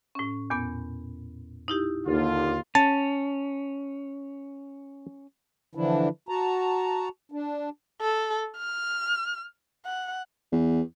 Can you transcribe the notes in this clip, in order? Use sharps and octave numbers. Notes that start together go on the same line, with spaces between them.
A2 C#4
E2 A#2 B3
D#4 E4 G4
D#2 D3 F4
C#4 A5
D3 E3 F3 D4 E4
F#4 A5 A#5
D4
A4
F6
F#5
E2